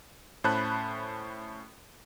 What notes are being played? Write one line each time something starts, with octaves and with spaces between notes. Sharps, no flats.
A2 C#4 C5 A5 B5 F#6